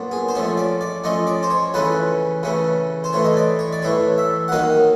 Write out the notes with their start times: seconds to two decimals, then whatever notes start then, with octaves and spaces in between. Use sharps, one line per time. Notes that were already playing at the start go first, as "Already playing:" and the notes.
Already playing: A#2 F#3 B3 D4
0.12 G#4
0.28 C5
0.35 F3 A3 C#4 C#5
0.57 D5
0.81 D5
1.04 F3 A3 C#4 D#5
1.27 D5
1.43 C5
1.50 C#5
1.74 C#3 E3 A3 C#4 B4
2.43 C#3 E3 A3 C#4
3.04 C5
3.13 A2 E3 A3 C#5
3.24 D#5
3.37 D5
3.59 C#5
3.73 D5
3.82 A2 E3 A3 C#5
4.18 E5
4.48 F#5
4.52 D#3 F#3 A#3 D#4 F5